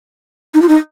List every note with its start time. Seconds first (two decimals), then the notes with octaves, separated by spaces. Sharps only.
0.54 D#4
0.62 F4
0.69 D#4